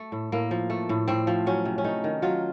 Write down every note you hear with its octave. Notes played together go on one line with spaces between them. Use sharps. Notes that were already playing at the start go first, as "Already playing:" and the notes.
Already playing: A3
A2
A2 A#3
F3
A3
A2
A2 C4
F3
F#3 C#4
C3
C#4
A3 D#4
D#3
F#3 F4